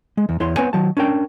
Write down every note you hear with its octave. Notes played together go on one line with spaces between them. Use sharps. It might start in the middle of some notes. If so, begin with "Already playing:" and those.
G#3
E2
E2 E4 C#5 C6
B3 C4 B4 C#5 G#5
D#3 F#3 A5
C#4 D4 A#4 G5